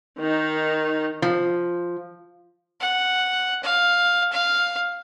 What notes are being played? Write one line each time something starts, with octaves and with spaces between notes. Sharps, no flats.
D#3 D#4
F3
F#5
F5
F5